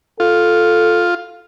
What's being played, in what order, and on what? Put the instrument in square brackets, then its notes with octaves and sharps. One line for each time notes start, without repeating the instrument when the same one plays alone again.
[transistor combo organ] F4 [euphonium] A4